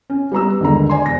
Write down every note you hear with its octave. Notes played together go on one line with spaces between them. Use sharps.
C#4
G3 B3 A#5 E6
G1 D#2 D3 G#3 A#5
C5 D5 G#5 C6
E1 A#6